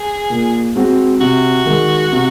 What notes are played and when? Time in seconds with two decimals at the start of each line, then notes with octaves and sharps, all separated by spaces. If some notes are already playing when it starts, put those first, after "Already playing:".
Already playing: G#4
0.30 A#2
0.75 G#3 C4 F#4
1.21 C3 F#4
1.66 D#3 G#3
2.12 C3